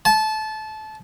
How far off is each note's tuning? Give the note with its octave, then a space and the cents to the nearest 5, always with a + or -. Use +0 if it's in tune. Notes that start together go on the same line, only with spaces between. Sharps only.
A5 -20